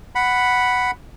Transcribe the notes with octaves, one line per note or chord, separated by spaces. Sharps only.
F#5 B5